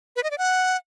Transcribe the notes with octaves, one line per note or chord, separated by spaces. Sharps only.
B4
D#5
D5
F#5